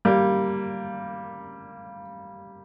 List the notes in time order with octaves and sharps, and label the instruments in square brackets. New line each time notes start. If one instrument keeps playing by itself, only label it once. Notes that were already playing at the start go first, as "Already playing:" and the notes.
[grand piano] G3 A#3